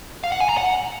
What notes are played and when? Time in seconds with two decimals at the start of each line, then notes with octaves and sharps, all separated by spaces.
0.24 F5
0.32 F#5
0.41 G#5
0.49 A#5
0.57 F#5